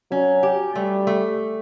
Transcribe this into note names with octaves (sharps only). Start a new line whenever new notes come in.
F#3 C#4
G4
G3 A3
A3